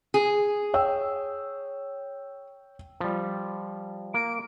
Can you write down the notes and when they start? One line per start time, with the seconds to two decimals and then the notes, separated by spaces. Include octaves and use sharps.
0.14 G#4
0.74 C#5 G5 E6
3.00 F3 G3
4.14 A#3 D7